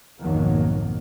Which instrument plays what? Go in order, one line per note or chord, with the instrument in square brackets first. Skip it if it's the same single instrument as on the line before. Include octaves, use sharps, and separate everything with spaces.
[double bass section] B1 F2 G#2 D#3 F#3 A#3